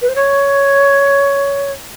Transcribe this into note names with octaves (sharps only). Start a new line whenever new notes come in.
B4
C5
C#5